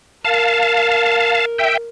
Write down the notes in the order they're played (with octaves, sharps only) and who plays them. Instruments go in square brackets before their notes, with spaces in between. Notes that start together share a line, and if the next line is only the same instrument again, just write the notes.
[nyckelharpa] A#4 [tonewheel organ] F5 A5
[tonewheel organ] E5 G5